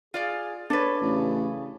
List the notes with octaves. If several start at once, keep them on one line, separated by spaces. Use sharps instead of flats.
F4 G#4 D5 F5
D4 A4 B4 C#5
A1 C#3